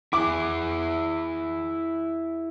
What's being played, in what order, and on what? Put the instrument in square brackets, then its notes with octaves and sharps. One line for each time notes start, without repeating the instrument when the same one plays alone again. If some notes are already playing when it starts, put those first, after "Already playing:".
[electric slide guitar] E4 G#4 [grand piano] D6